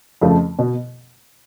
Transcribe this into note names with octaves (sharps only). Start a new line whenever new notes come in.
F2 C#3 F3 A3
B2